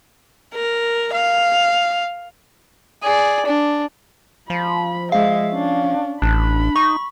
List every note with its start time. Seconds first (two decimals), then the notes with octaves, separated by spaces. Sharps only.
0.54 A#4
1.13 F5
3.03 G#4 D5
3.46 D4
4.50 F3 B5
5.12 G#3 E5 F5
5.50 C#4 D4
6.22 A1 D4 B5
6.76 D#4 C#6